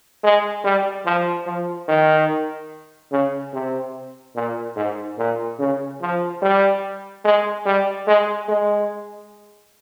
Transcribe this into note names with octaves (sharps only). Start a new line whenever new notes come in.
G#3
G3
F3
F3
D#3
C#3
C3
A#2
G#2
A#2
C#3
F3
G3
G#3
G3
G#3
G#3